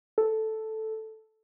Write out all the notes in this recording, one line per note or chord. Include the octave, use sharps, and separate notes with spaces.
A4